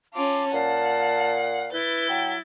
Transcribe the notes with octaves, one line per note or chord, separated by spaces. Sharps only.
C#4 F4 A5 D6
A#2 F5 F#5 A5
E4 B4 G6 A6
F#3 G5